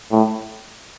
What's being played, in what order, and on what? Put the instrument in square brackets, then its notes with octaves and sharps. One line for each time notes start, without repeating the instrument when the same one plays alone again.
[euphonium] A2